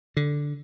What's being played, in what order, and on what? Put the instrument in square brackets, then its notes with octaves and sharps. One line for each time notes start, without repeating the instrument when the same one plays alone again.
[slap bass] D3